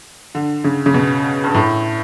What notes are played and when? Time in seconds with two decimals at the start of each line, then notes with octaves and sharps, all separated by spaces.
0.35 D3
0.64 C#3
0.86 C#3
0.94 B2
1.44 G2
1.54 A2